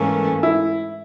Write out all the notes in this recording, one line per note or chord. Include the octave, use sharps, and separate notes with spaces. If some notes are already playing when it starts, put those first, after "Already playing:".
Already playing: G#2 E3 A3 A#3 C#4
E4